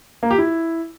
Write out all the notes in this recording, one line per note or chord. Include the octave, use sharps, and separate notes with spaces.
A#3
G4
E4